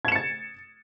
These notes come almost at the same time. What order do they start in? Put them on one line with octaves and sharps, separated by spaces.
G#6 E7 C#7 A6